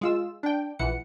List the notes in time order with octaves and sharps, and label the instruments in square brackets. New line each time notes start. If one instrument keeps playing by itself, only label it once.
[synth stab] G#3 F4 E6
D4 G5
A#1 E3 F#5 C#7